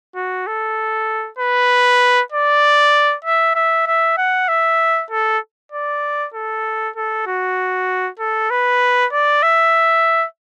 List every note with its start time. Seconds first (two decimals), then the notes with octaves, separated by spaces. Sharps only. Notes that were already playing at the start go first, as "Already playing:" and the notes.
0.15 F#4
0.46 A4
1.38 B4
2.32 D5
3.25 E5
3.55 E5
3.87 E5
4.17 F#5
4.48 E5
5.10 A4
5.72 D5
6.34 A4
6.96 A4
7.26 F#4
8.19 A4
8.50 B4
9.12 D5
9.43 E5